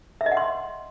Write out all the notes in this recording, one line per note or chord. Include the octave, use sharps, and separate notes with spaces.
E5
D#5
F#5
C6